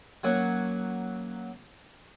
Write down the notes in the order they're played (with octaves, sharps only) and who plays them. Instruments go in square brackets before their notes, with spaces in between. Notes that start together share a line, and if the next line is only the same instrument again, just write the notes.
[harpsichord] F#3 A#3 C#4 C#5